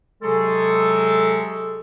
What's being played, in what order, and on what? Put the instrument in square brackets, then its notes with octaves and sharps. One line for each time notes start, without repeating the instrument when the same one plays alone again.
[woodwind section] C3 F#3 G#3 G#4 A4